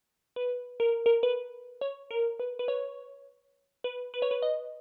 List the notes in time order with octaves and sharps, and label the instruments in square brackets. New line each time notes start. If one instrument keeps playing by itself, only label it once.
[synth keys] B4
A#4
A#4
B4
C#5
A#4
B4
B4
C#5
B4
B4
C#5
B4
D#5